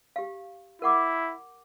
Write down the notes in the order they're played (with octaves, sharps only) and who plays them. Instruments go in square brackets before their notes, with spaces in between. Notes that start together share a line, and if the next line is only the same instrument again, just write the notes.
[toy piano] G4 F5
[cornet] E4 [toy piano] A#4 F#5 D6